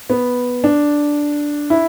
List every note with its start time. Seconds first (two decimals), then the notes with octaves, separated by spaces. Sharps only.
0.10 B3
0.64 D4
1.70 E4